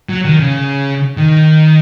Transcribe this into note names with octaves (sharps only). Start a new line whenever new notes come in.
F#3
D#3
C#3
D#3